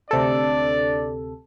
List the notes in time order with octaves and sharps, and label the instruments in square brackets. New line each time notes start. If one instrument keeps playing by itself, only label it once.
[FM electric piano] D2 C3 A4 [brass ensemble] D4 D5